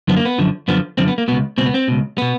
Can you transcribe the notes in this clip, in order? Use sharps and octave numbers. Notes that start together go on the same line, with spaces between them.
F#2 D3 F3 B3
A#3
B3
F#2 D3 F3
F#2 D3 F3 B3
F#2 D3 F3 C4
B3
A#3
C#2 B2 B3
C#2 B2 C4
B3
C4
C#2 B2
B2 B3